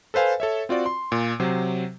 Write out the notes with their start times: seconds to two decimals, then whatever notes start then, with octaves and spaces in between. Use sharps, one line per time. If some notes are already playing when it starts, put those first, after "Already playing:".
0.14 A4 B4 C5 F5 G#5
0.40 A4 C#5 E5
0.69 C4 F4 F#4 D5
0.86 C6
1.12 A#2
1.40 C3 F#3 C5